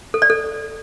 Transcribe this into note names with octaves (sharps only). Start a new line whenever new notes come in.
A4
D5
A4